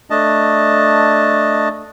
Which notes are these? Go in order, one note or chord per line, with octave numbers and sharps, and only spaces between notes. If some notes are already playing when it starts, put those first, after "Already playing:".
A3 D4 D#5 A5